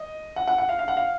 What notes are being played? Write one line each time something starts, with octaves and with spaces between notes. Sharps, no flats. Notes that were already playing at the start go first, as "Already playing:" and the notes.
Already playing: D#5
F#5
F#5
F#5
F5
F5
F#5
F5